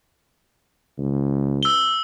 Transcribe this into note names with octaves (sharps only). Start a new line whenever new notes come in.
C#2
E6 G7